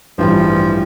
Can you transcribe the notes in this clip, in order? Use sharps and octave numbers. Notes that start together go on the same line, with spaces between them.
A1 G2 E3 F3 G3